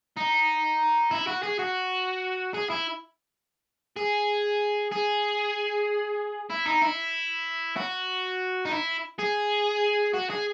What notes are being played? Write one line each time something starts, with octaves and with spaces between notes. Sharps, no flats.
D#4
E4
F#4
G#4
F#4
G#4
E4
G#4
G#4
E4
D#4
E4
F#4
D#4
E4
G#4
F#4
G#4